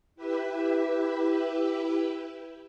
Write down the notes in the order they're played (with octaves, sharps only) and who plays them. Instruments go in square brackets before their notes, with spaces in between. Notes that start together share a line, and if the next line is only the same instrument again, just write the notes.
[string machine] E4 G4 B4 E5